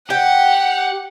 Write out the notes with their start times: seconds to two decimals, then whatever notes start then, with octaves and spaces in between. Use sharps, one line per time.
0.10 G4 F#5 G5